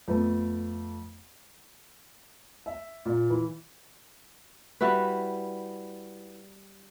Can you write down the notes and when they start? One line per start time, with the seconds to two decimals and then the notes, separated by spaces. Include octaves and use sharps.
0.08 F2 A3 B3
2.66 E5
3.05 A#2
3.30 E3
4.81 G3 E4 F#4 B4